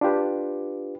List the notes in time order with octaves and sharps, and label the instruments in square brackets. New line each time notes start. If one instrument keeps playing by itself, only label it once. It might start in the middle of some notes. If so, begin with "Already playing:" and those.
[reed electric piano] D4 F4 G4 B4